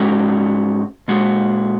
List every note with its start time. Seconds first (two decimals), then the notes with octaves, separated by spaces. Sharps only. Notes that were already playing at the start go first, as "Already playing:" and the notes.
Already playing: G#2 G#3 C#4 F#4
1.08 A#2 G#3 F#4